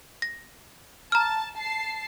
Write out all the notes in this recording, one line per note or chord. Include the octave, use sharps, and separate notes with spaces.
A#6
A5 A#5 F6
A5 C7